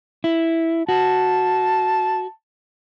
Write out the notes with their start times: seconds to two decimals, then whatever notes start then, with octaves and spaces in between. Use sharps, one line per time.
0.24 E4
0.89 F#4 A5